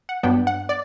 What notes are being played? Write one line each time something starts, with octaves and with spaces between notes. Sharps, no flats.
F#5
G2 F#3 B3 D4 G5
F#5
D5